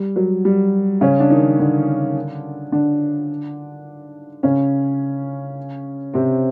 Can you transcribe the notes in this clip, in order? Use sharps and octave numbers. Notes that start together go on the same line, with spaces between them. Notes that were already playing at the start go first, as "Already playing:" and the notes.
Already playing: G3
F#3
G3
C#3 C#4
D4
D#3 D#4
D3 D4
D3 D4
C#3 C#4
C3 C4